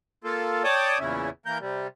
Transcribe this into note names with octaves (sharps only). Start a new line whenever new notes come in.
A#3 F4 A4
C#5 D5 G5 A5 D6 D#6
E2 A#2 C#3 C#4 E4
E3 A#3 A#4 G6
C3 G3